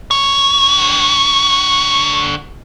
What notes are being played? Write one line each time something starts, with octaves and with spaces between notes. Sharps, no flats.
D3 C#5